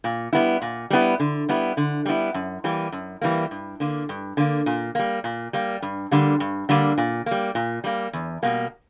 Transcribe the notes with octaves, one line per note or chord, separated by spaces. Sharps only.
A#2
G3 B3 E4
A#2
G3 B3 E4
D3
G3 B3 E4
D3
G3 B3 E4
F#2
E3 G3 A#3
F#2
E3 G3 A#3
G2
D3 A#3
G2
D3 A#3
A#2
G3 A#3
A#2
G3 A#3
G2
D3 G3 A#3
G2
D3 G3 A#3
A#2
A#3
G3
A#2
G3 A#3
E2
B2 G3 A#3